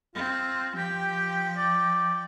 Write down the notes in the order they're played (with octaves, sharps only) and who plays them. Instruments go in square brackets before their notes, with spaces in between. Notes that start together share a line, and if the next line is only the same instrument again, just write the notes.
[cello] C4 [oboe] F4
[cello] F3 G5 [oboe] G4
[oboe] D5